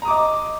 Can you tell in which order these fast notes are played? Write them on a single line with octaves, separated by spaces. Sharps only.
A#5 D#6 D6 D#5